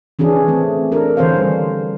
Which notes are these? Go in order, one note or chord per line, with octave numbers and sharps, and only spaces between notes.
E3 C#4 D4 G#4
A3 C4
D4 A4 A#4
D3 E3 C#4 C5 C#5 F5
G3